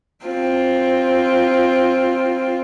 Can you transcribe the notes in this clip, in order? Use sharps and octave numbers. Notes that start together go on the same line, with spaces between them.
C4 F4